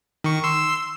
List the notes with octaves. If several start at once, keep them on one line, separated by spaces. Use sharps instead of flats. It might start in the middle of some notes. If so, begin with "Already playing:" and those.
D#3 C#6
C6 E6